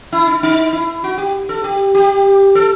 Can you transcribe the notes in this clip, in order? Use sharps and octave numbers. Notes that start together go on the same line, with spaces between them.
E4
D#4
D#4
E4
F#4
G4
A4
G4
G4
A4